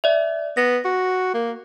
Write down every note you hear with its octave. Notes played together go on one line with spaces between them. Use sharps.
D5 E5
B3 A#6
F#4
A#3